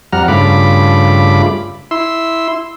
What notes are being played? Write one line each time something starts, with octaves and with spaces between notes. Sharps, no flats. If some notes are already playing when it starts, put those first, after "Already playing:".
F2 G3 F#5 A#5 F6
G2 C#3 A3 F4 B5 D6
E4 C6 E6